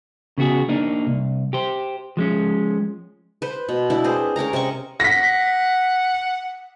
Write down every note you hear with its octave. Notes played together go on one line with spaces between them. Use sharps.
C#3 B3 F#4 G#4
A#3 D4 D#4
C2
G4 C5
F3 G#3 C#4
B4 C5
B2
B3 D4 E4
C4 G#4 B4 C5
C#4 A#4 F5 A#5
C3 C#4 D#5 C#6
F#5 A#6 B6